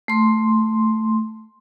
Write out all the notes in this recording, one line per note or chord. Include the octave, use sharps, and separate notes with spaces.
A3 C6